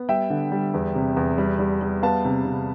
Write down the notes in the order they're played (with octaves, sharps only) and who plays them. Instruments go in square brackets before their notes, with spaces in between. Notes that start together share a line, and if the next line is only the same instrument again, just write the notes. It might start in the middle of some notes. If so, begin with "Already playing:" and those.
Already playing: [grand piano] B3
G3 E5 G5
D3
G3
E2
C3
E2
G3
G3
G3
B3 F5 A5
C3
C3